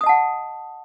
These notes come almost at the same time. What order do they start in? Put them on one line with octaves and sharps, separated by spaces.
D#6 D#5 A5 F#5